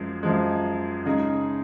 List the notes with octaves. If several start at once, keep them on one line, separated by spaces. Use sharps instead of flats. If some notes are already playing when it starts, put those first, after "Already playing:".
Already playing: F#2 F3 G#3
F#2 F3 G#3
C#3 G#3 D#4 G#4